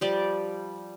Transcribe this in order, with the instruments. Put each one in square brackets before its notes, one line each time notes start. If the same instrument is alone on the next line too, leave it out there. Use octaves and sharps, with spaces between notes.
[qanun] F3 G3 D5